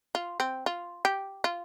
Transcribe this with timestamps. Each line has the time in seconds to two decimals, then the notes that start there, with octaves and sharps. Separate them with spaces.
0.15 F4
0.40 C4
0.66 F4
1.05 G4
1.44 F4